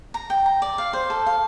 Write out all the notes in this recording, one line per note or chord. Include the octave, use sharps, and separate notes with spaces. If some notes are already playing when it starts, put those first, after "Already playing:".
A#5
G5
A#5
D5
F5
C5
A4
F5